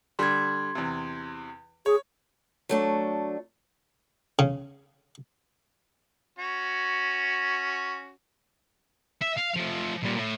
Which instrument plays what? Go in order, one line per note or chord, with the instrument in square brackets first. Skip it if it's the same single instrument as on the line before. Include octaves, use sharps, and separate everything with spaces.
[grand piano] D3 G3 [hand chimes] C6 G#6
[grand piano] E2 C3
[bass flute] G#4 [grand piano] C#5
[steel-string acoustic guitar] F#3 A3 D4
[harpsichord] C#3
[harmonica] C#4 F#4
[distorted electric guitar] E5
F5
F3 A3
A#2 G3
A2